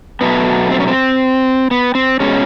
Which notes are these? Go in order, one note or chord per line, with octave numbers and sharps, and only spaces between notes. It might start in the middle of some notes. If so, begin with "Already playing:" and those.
B2 F#3 A3 B3
C4
C#4
C4
B3
C4
B2 G#3 C#4